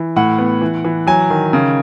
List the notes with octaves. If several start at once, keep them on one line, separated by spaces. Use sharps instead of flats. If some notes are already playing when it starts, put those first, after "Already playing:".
Already playing: E3
A2 F#5
B3
E3
E3
F#3 G#5
D#3
C#3